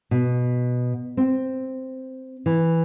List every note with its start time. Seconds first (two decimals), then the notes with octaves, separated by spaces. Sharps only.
0.11 B2
1.17 C4
2.46 E3